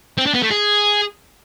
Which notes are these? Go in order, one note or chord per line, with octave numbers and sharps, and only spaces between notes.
C4
D4
B3
A3
G#4